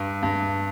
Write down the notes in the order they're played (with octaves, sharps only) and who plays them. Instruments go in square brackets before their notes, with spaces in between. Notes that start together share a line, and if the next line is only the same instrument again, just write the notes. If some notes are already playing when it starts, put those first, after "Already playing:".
Already playing: [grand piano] G2
G2